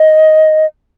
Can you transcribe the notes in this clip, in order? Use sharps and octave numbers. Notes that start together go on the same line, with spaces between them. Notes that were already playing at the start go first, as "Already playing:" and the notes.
Already playing: D#5